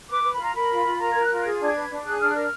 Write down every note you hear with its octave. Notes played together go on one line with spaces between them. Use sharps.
B4 D6
B4
B5
F4 A#5
A#4 B5
F4
F4
A#4 A#5
A#4 G#6
F#6
F4
F#6
G#4 G#6
D4
G#6
B4
D4
G#4 F#6
D4 F6
F#6
A#4 F6